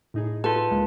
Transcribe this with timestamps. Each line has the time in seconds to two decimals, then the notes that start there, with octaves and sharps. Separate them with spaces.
0.14 A2 D#4 G#4
0.44 F4 A4 B4
0.71 C#2 G#3 A#3